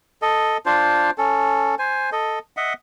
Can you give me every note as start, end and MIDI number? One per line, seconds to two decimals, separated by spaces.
0.22 0.57 69
0.22 0.57 75
0.66 1.11 62
0.66 1.11 65
0.66 1.11 72
1.18 1.75 61
1.18 1.75 69
1.79 2.10 72
1.79 2.10 80
2.12 2.39 69
2.12 2.39 75
2.57 2.73 75
2.57 2.73 76
2.57 2.73 78